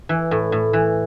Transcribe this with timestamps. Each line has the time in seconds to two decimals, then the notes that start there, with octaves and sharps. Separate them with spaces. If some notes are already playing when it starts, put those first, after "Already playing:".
0.09 E3
0.31 A2
0.52 A2
0.73 E3